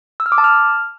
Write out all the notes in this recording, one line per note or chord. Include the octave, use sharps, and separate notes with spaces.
E6
F6
D6
A5
F6